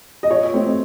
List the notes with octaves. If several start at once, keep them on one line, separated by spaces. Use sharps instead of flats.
D#5
A#2 C#5
A3 C4